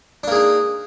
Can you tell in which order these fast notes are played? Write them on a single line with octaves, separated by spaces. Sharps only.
D4 A#3 G#4 D#4